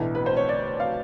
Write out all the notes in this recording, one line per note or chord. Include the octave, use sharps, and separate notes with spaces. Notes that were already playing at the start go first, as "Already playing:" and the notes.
Already playing: B1 A2 E3 A3 D4
B4
C5
C#5
D5
F5